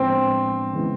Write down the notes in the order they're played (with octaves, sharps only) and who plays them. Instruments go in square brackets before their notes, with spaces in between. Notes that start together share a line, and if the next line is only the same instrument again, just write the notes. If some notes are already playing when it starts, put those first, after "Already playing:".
Already playing: [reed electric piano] A2 F3 G#3 B3 D4 [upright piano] C4
[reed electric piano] C#3 E3 G#3 B3